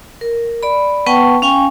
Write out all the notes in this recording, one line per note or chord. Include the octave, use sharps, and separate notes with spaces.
A#4
D5 B5
B3 B4 F#5 G5 A5 C#6
C#4 F5 G5 G#5 C#6